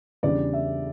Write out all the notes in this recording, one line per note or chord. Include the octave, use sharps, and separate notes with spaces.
E2 C#3 G3 D4 D5
E5